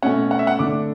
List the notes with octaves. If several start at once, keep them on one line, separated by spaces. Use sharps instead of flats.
B2 A3 C#4 F#5
F#5
E5
F#5
D3 A3 D4 D6